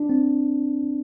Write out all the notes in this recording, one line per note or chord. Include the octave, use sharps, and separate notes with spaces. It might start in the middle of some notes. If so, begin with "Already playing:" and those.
Already playing: D4
C4